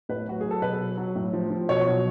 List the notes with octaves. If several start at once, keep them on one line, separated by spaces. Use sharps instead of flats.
A2 B4
F#3 F#4
F#3 G#4
A4
B2 B4
F#3
F#3
A2
F3
F3
B2 C#5
F#3